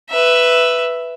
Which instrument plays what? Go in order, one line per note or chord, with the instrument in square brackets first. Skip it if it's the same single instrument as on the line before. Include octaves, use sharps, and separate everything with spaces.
[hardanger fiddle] B4 E5